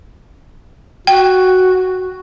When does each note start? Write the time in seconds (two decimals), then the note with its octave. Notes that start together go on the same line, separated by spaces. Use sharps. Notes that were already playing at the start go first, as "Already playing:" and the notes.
1.07 F#4 G5